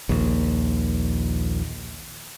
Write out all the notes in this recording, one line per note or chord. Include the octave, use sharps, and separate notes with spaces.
A#1 D#2